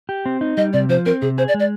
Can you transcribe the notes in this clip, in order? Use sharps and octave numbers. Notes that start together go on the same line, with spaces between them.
G4
C4
D#4
G3 D#5
C3 D5
F3 C5
C4 A#4
C3 G#4
G#4 C5
D5
G#3
D5